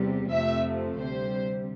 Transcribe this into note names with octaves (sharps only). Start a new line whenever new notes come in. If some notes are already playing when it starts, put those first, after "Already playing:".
Already playing: E2 C3 G3
F2 C3 F3 A3 E5
D2 C3 G3 C5